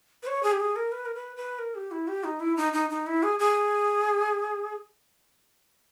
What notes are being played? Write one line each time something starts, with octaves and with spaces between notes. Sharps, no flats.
B4
C#5
G#4
G4
G#4
A#4
B4
A#4
B4
B4
A#4
G4
E4
G4
D#4
E4
D#4
D#4
D#4
E4
G#4
G#4